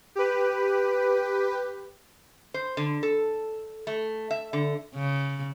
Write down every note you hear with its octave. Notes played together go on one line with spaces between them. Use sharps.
G4 B4
C5
D3
A4
A3
E5
D3
C#3